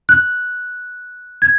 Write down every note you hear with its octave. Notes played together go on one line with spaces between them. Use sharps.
F#6
G#6